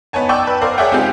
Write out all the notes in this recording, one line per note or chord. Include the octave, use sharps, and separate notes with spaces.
B3 D#4 C#5 G#5 A5
D5 G5 A5 C#6 E6
B4
A#4 C5 D5 F5
G#4 C#5 D5 E5 F#5 G5
G#3 C4 D#4 F4 G4 G#4